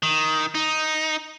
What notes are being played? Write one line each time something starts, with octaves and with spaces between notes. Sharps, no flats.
D#3
D#4